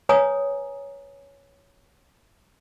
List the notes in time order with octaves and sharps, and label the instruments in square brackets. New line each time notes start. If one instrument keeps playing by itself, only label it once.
[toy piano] B4 C#5 G#5 A#5 D#6